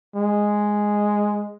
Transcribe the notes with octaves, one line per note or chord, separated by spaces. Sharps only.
G#3